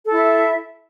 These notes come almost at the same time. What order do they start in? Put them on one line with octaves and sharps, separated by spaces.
A4 E4 E5